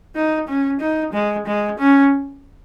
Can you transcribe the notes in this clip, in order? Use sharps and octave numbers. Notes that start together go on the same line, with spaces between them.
D#4
C#4
D#4
G#3
G#3
C#4